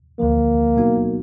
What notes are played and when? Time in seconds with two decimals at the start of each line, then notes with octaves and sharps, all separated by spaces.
0.19 D2 D3 F3 A#3
0.76 B2 F#3 B3 D#4 F#4